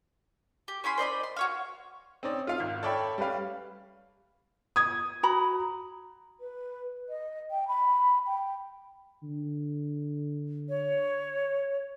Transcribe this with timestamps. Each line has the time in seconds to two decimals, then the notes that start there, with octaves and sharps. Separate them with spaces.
0.68 G4
0.84 C#4 E4 B5 C6
0.98 C5 D5 D#5 B5
1.23 C6
1.37 F#4 C#5 F5
2.23 C4 C#4 D#4 D5
2.47 F4 F5 F6
2.60 G#1
2.83 A4 C#5 D5 E5 G5 B5
3.18 G3 C#4 G4 B4 F5
4.76 D#6 G#6
5.23 F#4 A#5 B5
6.40 B4
7.09 D#5
7.51 G5
7.68 B5
8.27 G5
9.23 D3
10.69 C#5